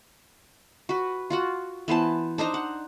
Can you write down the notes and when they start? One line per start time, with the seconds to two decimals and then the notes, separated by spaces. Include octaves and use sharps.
0.89 F#4 B4
1.30 F4 F#4 F#5
1.88 E3 B3 C5 A5
2.38 D4 D#4 C5 A#5
2.54 F#5